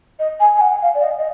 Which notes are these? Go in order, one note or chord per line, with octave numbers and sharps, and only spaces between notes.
D#5
G#5
G#5
F#5
F5
D5
D#5
D#5